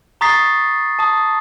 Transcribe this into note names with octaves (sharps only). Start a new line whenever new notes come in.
A#5 C#6 D#6 A6 B6 C7
A5 D#6